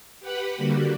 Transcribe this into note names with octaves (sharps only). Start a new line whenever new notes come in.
G4 B4 F#5 B5
D3 G3 A#3 F#4